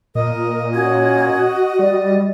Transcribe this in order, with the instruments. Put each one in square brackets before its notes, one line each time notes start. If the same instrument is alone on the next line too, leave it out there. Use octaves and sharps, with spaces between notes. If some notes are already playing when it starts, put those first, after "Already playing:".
[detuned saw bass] A#2 [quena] A#4 [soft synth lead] D#5
[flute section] C#4 G#5 G#6 [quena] F#4
[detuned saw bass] G3 [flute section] D5